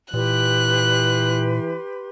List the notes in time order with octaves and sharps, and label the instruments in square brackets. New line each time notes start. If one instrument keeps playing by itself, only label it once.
[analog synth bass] A#2 [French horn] E3 [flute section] G4 B4 C6 [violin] F#6